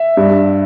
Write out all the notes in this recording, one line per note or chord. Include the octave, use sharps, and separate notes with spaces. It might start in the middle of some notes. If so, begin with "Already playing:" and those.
Already playing: E5
G2